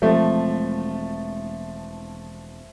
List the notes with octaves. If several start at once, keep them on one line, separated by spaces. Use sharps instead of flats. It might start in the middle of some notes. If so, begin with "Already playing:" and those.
E1 F3 G#3 A3 C4